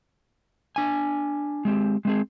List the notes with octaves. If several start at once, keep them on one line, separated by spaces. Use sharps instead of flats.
D4 G#5
G#3 C4 G4
G#3 C4 G#4